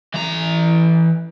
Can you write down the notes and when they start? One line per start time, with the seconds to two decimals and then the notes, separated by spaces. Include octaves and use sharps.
0.14 E3 A#5